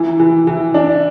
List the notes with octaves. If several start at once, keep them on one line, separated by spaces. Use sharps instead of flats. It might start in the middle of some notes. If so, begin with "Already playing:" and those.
Already playing: E3
E3
E3
D4